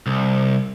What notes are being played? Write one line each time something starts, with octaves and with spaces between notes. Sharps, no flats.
C2